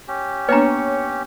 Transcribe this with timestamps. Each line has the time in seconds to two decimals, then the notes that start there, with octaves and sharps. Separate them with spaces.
0.08 C#4 G4
0.49 A#3 B3 D4 B4 C#5 A#5